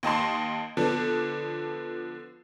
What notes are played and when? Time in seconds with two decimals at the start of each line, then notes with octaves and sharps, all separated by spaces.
0.03 D#2 D#5 A5 C6
0.77 D3 F3 B3 D4 A4